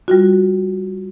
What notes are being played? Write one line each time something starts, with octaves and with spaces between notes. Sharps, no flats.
G3 F4 F#4